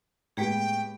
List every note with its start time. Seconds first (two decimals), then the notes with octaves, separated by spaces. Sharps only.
0.37 A2 G#3 A#3 B3 G4 G#4 G5